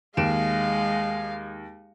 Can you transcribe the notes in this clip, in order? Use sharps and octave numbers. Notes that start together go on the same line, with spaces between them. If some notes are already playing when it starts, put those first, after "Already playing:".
D#2 G#3 F5 D7 E7